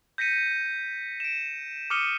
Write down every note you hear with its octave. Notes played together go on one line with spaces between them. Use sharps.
G6 A#6 B6 C#7 D#7
D7 E7
D6 D#6 F6 C#7 D#7 G7